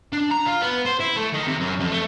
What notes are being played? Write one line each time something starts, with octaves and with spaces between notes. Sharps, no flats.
D4
A#5
F4
B3
C5
E4
A3
D#3
C3
F#2
F2
A3